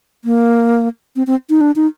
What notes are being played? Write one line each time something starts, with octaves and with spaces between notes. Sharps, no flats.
A#3
C4
C4
D#4
D4
D#4